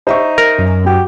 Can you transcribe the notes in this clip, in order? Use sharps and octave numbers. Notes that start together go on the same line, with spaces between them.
D#4 C5 E5 C#6
A#4
F#2
F#4 G4